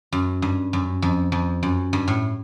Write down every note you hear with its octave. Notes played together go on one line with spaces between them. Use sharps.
F#2
G2
F#2
F2
F2
F#2
G2
A2